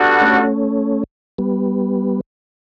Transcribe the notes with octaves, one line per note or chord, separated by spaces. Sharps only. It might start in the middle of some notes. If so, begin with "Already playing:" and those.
Already playing: G3 B3 D4 F#4 A4
A3 C#4
G3 B3